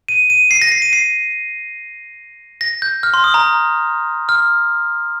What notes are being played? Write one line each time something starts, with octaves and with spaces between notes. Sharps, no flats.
D#7
D#7
C7
A#6
C7
D#7
C7
A#6
G6
F6
C6
D#6
A#5
F6